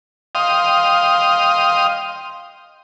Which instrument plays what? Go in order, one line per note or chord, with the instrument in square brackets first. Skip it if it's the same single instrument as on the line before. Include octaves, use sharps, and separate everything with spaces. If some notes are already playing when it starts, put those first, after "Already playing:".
[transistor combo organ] D#5 F5 G5 C6 D#6